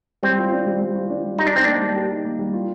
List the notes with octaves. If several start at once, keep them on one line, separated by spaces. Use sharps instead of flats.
G3 C4
F4
D4
G3
G3
F4
D4
G3
D#4 G4
D4
C4 D#4
A#3 D4
G3
G4
D#4
A#3
G3
F4